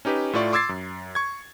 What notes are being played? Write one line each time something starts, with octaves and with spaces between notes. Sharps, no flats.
C#4 D#4 G4 B4
A2 A3 F4 D5 C#6
C6 D6 E6 G#6 A6 C7
F#2
C#6 G#6